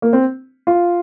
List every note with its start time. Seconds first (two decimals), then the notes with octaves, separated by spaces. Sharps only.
0.02 A#3
0.13 C4
0.67 F4